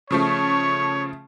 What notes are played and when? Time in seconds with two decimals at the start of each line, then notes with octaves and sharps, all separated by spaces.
0.11 C#3 F3 A3 C#5 C#6